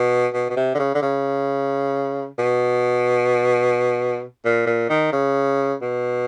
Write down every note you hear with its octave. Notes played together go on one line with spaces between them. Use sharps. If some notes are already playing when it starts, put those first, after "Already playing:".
Already playing: B2
B2
B2
C3
D3
C#3
D3
C#3
B2
A#2
A#2
D#3
C#3
B2